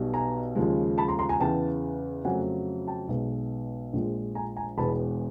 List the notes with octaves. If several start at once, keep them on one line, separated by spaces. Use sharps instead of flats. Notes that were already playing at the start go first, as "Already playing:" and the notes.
Already playing: B1 B2 G3
G#5 A#5
D#2 C#3 F3 G#3
A5 B5
A#5 C6
A#5 C6
G#5 A#5
E2 C#3 E3 G5 A5
F2 C#3 F#3 A3 F#5 G#5
G5 A5
B1 B2 G#3
A#1 A#2 F3 G#3
G#5 A#5
G#5 A#5
E1 E2 B2 G#3 A5 B5